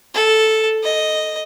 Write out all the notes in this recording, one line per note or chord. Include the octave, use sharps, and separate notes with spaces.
A4
D#5